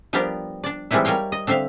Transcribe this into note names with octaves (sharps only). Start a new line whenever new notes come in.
F3 G3 B3 D4 G4 A#4
D4 D5
E3 G3 G#3 C4 D#4 E4
G3 A#4 C#5 F5 G5
D#5
D3 C4 C5 E5 F5